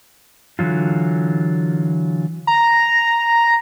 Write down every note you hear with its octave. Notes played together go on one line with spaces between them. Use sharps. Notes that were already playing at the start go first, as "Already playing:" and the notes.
D3 E3 F#3 F4
A#5